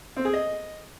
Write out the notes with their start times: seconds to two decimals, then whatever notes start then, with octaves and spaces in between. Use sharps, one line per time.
0.17 C4
0.25 G#4
0.33 D#5